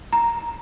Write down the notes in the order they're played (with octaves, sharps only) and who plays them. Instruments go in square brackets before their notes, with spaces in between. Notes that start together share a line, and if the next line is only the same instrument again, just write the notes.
[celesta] A#5